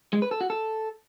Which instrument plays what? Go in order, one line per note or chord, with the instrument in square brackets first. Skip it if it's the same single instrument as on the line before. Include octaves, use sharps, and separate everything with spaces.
[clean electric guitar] G#3
B4
A4
F#4
A4